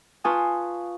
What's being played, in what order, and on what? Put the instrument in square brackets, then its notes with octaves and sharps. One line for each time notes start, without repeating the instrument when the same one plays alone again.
[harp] F4 B4 G#5 A5 C#6 D#6